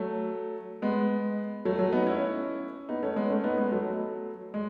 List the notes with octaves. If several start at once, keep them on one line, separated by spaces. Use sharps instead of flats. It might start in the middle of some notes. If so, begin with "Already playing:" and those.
Already playing: F#3 A3
G#3 B3
F#3 A3
F#3 A3
B3 D#4
C#4 E4
B3 D#4
A3 C#4
G#3 B3
A3 C#4
B3 D#4
G#3 B3
F#3 A3
G#3